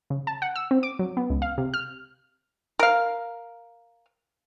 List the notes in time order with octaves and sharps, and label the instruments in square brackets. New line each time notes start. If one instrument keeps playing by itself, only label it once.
[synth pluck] C#3
A5
F#5
E6
C4
D6
F#3
B3
C#2
F5
C3
F6
[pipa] A#4 F5